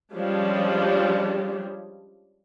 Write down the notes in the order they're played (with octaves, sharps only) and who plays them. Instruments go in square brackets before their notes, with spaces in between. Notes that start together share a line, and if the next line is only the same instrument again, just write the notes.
[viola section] F3 G3 G#3 C#4 D4 G4